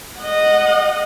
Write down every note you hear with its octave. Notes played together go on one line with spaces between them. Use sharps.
D#5 F#5